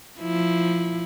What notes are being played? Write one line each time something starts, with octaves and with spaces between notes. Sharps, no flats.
F3 E4